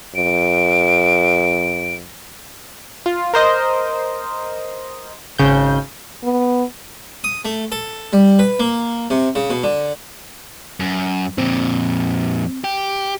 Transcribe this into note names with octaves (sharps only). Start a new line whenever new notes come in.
F2 D7
F4
A#4 C5 D#5
G#1 C#3 G6
B3
D#6
A3
A4
G3
B4
A#3
C3
C#3
B2
D3
F#2
F2 A#2 C4
G4